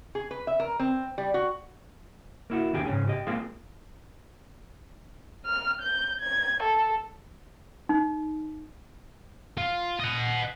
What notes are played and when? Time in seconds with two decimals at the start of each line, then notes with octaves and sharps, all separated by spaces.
0.15 G#4
0.31 B4
0.47 E5
0.60 A#4
0.79 C4
1.18 G3
1.34 F#4
2.50 A#3 E4 F#4
2.73 D#2 B2 D3 G4 G#4
2.86 G#2 C#3 C#4 G#4
3.08 G4 D#5
3.27 G#3 A#3 C4 F4 G#4 F5
5.45 F6
5.82 G6
6.21 G#6
6.63 A4
7.89 D#4
9.57 F4
10.00 D#5 F#5